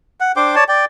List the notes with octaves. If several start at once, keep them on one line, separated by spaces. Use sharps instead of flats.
F#5
D4 C5 G5 D6
C#5 D5 A5
D5 G5